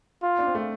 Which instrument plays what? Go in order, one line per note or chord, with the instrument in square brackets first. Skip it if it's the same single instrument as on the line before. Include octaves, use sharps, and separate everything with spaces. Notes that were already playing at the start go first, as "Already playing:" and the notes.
[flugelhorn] F4
[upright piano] D4
C4
A3